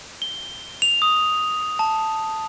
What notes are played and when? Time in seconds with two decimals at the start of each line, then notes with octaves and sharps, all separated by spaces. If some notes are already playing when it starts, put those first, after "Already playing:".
0.22 G7
0.82 F7
1.02 D#6
1.79 A5